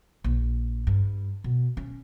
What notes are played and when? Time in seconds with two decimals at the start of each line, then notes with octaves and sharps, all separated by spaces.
0.24 A#1
0.87 G2
1.44 B2
1.77 C#4